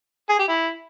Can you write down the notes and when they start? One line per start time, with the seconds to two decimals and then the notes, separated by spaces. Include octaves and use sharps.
0.29 G#4
0.39 G4
0.48 E4